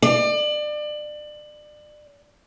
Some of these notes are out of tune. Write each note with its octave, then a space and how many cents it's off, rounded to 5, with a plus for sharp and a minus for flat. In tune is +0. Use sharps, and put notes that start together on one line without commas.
D5 +30